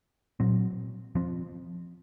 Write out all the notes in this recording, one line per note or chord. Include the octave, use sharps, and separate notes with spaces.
A#2 F#3 C4
F3 C4